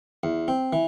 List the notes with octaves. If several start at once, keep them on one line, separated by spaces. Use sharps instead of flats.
E2
C4
E3